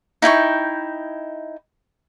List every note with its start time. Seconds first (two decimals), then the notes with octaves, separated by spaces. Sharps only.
0.22 D#4 E4 G5 C#6